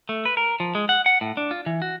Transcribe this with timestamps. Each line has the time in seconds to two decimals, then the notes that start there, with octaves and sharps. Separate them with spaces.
0.09 A3
0.25 B4
0.37 A#4
0.60 F3
0.75 G#3
0.89 F#5
1.06 F#5
1.21 A2
1.37 D4
1.51 F4
1.66 E3
1.82 F#4